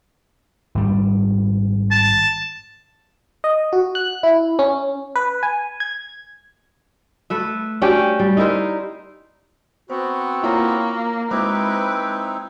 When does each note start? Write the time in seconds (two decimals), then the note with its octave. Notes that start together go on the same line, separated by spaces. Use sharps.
0.75 G#1 G3
1.91 A5
3.44 D#5
3.73 F#4
3.95 F#6
4.23 E4
4.59 C#4
5.16 B4
5.43 G#5
5.80 G#6
7.30 A3 B4 E5
7.82 C#4 D4 F#4 G4
8.19 G3
8.37 D#4 E4 A#4 C5
9.90 B3 C4 F#4 C5
10.43 A#3 E4 F4 C#5
11.31 G#3 C4 D#4 E4 B4 C5 D6 A#6